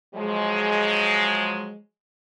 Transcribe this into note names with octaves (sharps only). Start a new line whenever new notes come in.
F3 F#3 G#3